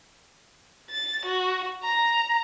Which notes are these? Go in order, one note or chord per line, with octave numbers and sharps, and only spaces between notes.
A6
F#4
A#5